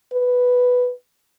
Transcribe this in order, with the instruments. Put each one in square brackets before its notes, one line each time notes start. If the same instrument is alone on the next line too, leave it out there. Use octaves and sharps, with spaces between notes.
[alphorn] B4